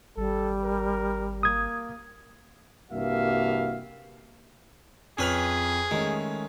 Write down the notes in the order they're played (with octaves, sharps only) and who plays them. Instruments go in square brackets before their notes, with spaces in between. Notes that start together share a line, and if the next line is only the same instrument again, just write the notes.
[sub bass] G#1 [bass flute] G3 [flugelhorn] A4
[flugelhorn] A#4
[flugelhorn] A#3 [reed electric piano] D#6 G#6
[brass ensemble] C2 G2 A#3 F#4 E5 F5
[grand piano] F2 F6 F7 [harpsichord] C#4 B4 B5 [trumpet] G#4
[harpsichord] D#3 [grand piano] G#3 A3 C#4